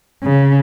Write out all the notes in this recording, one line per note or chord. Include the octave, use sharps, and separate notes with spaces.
C#3